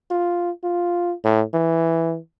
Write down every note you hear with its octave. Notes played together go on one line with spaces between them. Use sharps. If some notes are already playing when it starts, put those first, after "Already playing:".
F4
F4
A2
E3